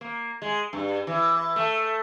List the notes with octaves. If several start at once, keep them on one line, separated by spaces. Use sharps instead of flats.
A#3
G#3
G2
E3
A3